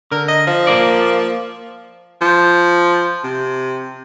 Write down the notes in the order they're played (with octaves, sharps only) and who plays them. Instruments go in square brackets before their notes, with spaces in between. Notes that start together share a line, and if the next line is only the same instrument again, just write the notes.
[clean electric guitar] D3 [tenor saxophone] A#4
[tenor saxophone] D#5
F3
[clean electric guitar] A#3 A#4 D5
[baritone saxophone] F3
C3